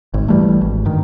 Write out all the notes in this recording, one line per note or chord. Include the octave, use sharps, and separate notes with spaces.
G#1
E3 G3 A3
G#1
G2 D#3